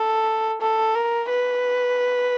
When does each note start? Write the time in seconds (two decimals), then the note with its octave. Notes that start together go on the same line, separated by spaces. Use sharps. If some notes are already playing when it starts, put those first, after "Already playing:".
Already playing: A4
0.61 A4
0.95 A#4
1.29 B4